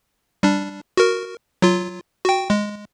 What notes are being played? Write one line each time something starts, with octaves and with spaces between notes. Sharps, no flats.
G3 D4
F#4 A#4
F#3 F4
F#4 G5
G#3